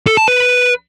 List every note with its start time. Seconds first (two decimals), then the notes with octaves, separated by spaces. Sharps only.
0.07 A4
0.17 A5
0.28 B4